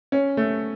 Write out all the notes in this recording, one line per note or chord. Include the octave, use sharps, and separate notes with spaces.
C#4
A3